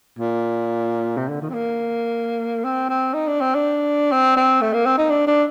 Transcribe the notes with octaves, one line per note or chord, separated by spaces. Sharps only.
A#2
C3
D3
D#3
C4
A#3
C4
C4
D#4
D4
C4
D4
C4
C4
A3
A#3
C4
D#4
D4
D4